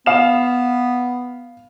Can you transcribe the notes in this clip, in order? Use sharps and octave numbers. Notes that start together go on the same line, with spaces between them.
B3 F5 E7